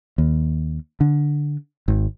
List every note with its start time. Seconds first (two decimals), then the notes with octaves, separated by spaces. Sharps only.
0.18 D#2
1.01 D3
1.88 G#1